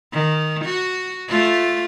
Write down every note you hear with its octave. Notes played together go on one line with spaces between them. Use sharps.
D#3
F#4
A3 F4